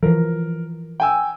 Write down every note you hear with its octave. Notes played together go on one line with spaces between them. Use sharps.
E3 F3 A#4
G5 G#5 E6